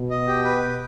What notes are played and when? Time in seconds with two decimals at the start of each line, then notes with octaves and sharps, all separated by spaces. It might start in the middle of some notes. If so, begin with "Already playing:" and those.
Already playing: B2
0.11 D#5
0.27 G4
0.45 B4
0.62 G5